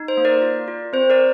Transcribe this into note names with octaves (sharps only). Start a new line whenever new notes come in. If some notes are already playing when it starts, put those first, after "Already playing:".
Already playing: D#4
C5
A#3
A#4 D5
F4
F4
C4 C5
A#4 D5